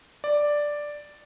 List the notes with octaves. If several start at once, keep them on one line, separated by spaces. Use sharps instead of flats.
D5